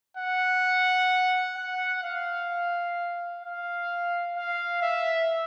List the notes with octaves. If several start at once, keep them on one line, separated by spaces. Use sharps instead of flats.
F#5
F#5
F5
F5
F5
E5